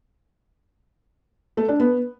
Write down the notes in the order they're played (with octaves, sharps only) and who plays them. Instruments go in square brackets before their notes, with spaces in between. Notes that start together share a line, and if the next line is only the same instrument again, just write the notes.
[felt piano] A3
D4
B3